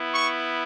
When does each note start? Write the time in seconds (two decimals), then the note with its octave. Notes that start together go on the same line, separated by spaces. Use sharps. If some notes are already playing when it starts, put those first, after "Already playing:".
Already playing: B3 E4
0.15 C#6